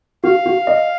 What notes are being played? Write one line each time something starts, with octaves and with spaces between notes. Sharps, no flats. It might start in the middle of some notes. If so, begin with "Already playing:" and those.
F#4 F5
F#4
D#5